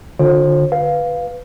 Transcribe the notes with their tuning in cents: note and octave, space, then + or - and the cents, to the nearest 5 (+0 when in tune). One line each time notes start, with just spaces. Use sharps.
D3 +10 F4 +45 C5 +35
B4 +0 F5 +0